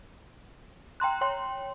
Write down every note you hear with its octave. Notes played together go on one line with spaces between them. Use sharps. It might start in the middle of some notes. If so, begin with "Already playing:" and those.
G5 A#5 C6 F#6
C#5 G5 C6